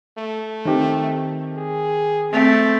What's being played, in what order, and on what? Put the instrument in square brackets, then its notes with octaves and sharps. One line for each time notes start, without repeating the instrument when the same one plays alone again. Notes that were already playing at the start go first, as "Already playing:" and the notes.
[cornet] A3
[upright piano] D#3 C4 G4
[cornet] G#4
[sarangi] A3 [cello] C4